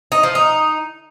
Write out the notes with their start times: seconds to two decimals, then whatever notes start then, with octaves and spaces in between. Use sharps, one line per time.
0.12 D#4
0.23 F3
0.35 D#4